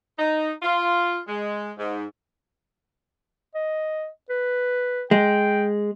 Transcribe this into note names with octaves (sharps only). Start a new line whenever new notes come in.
D#4
F4
G#3
G#2
D#5
B4
G#3 G5